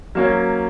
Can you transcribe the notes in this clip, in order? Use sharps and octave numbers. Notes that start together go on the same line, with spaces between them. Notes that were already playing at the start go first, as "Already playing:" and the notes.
F#3 A#3 C#4